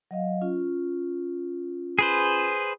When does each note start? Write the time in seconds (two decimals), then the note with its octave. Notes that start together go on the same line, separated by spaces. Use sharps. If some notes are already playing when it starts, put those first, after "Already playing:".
0.11 F#3 D#5 F5
0.41 C#4 F4
1.99 G#4 B4 C5